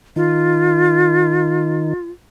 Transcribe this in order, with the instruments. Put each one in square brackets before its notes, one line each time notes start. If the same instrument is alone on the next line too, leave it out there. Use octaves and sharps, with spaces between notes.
[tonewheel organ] D#3 [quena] F4